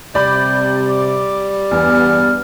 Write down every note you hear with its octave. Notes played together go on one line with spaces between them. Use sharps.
C3 G3 D5 B5 G6
D6
E2 G2 B3 F6